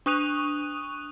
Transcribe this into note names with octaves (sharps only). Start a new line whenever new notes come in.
D4 C#6 D#6 F#6 D#7 F7